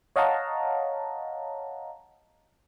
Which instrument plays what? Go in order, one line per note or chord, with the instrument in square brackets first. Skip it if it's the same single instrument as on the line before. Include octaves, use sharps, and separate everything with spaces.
[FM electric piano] C#5 D#5 F5 F#5 A5 A#5